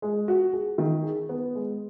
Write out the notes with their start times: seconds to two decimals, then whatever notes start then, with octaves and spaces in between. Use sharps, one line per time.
0.02 G#3
0.28 F#4
0.53 G#4
0.78 D#3
1.03 G#4
1.29 B3
1.55 G#3